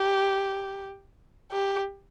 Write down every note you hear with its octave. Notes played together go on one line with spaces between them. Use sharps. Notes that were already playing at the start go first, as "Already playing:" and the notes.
Already playing: G4
G4